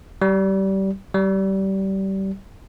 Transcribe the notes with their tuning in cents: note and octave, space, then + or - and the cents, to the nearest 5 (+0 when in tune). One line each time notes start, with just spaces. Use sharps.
G3 -25
G3 -25